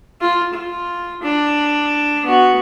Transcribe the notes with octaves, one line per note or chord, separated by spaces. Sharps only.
F4
F4
D4
B3 F#4